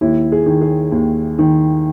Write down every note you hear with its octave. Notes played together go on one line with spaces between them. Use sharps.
D#2 E4
G#4
D#3
G#4
D#2
D#3